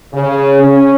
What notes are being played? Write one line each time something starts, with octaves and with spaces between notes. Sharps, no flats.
C#3
C#4